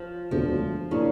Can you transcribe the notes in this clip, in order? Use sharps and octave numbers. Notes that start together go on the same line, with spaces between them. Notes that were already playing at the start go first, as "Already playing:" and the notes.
Already playing: F3
E1 D2 D3 F3 A3
C#3 E3 A#3 D4